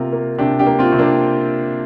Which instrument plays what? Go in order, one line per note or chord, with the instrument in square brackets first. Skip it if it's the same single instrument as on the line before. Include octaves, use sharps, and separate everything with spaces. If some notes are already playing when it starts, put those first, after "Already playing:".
Already playing: [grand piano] C3 A#3 F4 A#4
A#3
C3 D4 G4
D4 G4
A#3
C4 F4
C3
A#3 D4